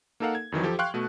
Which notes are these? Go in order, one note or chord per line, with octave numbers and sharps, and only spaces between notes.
A#3 D#4 A4 A#4 F5 F#5
G#6
F2 D#3 E3 F#3
F3 G4 A4
F5 G5 C6 C#6 F#6
B2 A3 F#4